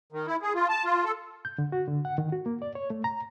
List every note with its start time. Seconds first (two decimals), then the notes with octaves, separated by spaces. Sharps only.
0.12 D#3
0.27 E4
0.42 G#4
0.55 F4
0.69 A5
0.85 F4
1.04 A4
1.45 G6
1.58 D3
1.72 F#4
1.88 D3
2.05 F#5
2.18 D#3
2.32 F#4
2.46 A#3
2.62 D5
2.75 C#5
2.90 A3
3.04 A#5